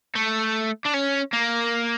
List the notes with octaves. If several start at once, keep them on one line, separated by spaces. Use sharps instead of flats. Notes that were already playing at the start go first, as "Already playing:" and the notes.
A3
D4
C#4
A#3